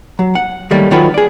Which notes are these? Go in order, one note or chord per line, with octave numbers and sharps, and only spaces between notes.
F#3
F#5
D#3 F#3 G3 A3 A#3
D#3 F#3 F4 F#4 A4 B4
G#4 D5